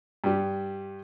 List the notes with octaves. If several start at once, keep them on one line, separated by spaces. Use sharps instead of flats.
G2 G3